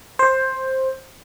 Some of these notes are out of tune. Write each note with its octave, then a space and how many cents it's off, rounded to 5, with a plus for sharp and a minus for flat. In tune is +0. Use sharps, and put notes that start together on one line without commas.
C5 +10